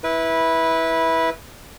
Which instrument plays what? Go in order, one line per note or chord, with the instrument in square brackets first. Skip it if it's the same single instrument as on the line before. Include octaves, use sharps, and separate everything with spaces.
[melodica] E4 B4